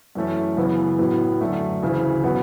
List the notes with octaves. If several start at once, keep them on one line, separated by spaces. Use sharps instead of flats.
F#2 E3 A3 C#4
F#2 C#3 E3 B3
A2 F#3 B3
F#2 D3 A3
D2 C#3 E3
B2 F#3 B3